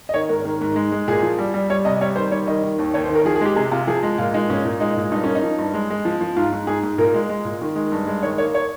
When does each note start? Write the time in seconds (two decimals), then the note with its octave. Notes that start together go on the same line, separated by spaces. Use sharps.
0.09 D#5
0.14 D#3 C#5
0.29 G#2 A#4
0.45 D#3
0.61 G#2
0.76 G#3
0.92 G#3
1.08 A#2 G#4
1.23 F3
1.39 G3
1.54 G3
1.70 G3 C#5
1.85 C3 D#5
2.01 G3 C#5
2.16 D#3 C5
2.31 G3 C#5
2.47 D#3 D#5
2.63 D#3
2.79 D#2
2.94 D#2 C#5
3.04 C5
3.10 D#3
3.15 A#4
3.25 F3 G#4
3.36 G#4
3.41 G#3 G4
3.56 C3 G#4
3.71 C3 F4
3.87 F3 G#4
4.03 G#3
4.18 A#2 F4
4.34 G#3 D#4
4.50 A#2 C#4
4.65 A#2
4.80 G#3 D#4
4.97 A#2
5.12 G2 D#4
5.24 A#3 C#4
5.35 D#4
5.43 F3
5.58 G2
5.74 G#3
5.90 G#3
6.05 F3
6.21 F3
6.36 G#2 F4
6.52 G#2
6.67 G#2 G#4
6.83 G#2
6.98 A#2 A#4
7.14 G#3
7.29 G#3
7.45 A#2
7.61 D#3
7.76 G#3
7.92 G2
8.07 G#3
8.23 D#3 C#5
8.38 A#3 C#5
8.55 C#5